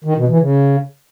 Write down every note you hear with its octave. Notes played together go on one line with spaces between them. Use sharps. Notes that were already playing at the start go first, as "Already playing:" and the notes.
D#3
B2
E3
C#3